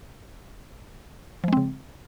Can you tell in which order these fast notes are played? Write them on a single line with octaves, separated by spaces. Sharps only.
F3 G#3 C4 C#3